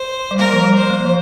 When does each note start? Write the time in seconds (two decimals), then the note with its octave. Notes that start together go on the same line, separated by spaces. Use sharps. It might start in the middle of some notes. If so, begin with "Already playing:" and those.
Already playing: C5
0.31 G3
0.38 A#3 A#4
0.53 F3
0.64 G3
0.77 C5
0.90 A#3
1.05 F3